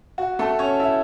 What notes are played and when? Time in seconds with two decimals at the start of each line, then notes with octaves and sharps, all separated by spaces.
0.18 F#4
0.39 A3 A4
0.59 C#4 C#5
0.80 E4 E5